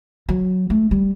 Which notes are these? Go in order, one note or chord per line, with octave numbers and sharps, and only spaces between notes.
F#3
A3
G3